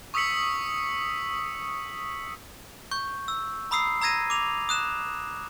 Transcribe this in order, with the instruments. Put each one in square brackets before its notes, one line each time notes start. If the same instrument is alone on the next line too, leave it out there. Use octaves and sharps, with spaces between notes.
[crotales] C#6 D#6 E6 B6 C#7 F#7
[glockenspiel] C#6 G6
E6
A#5 B5 D#6 E6 C7
A#5 E6 G#6 A#6 D#7
D6 F7
D#6 F#6 E7